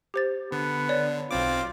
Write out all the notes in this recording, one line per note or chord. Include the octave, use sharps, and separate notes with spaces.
G4 C5 A6
D3 B3
C#5 D5
B1 C4 F4 D6